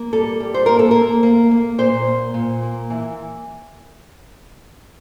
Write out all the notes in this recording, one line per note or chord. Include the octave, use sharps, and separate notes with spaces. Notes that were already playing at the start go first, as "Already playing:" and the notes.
Already playing: A#3
G3 A4
G3
C5
A#3 A#4
A4
A#3 A#4
A#3
A#3
A#2 C5
A#3
A#2
A#3
E3